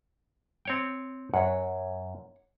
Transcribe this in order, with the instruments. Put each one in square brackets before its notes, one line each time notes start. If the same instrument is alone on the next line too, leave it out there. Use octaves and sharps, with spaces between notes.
[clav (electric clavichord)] C4 C#5 G5
[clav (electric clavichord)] F#2 [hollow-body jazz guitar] C#5 F#5